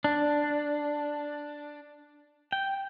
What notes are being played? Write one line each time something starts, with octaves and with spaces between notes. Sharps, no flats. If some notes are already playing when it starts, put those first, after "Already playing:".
D4
G5